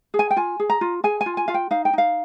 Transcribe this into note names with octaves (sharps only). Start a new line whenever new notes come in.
G#4
G#5
G5
F4 G#5
G#4
A#5
F4
G#4 G#5
G#5
F4
G#5
F4 F5
G5
D#4 F5
G5
D#4 F5